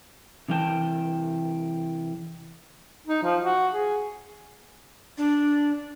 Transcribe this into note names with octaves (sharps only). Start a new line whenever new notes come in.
C3 E3 G5 A5
D#4
F3
F#4
G#4
D4